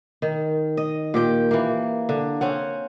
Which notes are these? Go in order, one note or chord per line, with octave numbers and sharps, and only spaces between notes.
D#3
D#5
A#2 G4 G5
E3 A#3
D3
C4 C#4 F#5